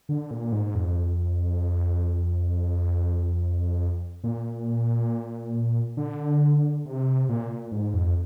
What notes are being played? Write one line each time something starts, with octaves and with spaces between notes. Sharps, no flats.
D3
A#2
G#2
F2
A#2
D3
C3
A#2
G#2
F2